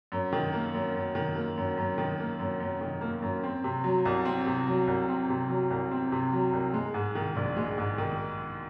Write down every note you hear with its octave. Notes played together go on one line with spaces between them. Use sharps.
F#2
D#3
A#3
F#2
F#2
D#3
A#3
F#2
F#2
D#3
A#3
F#2
F#2
D#3
A#3
F#2
C4
C3
F#3
C2
C4
C3
F#3
C2
C4
C3
F#3
C2
C4
C3
F#3
C2
G#3
G#2
D#3
A#1
G#3
G#2
D#3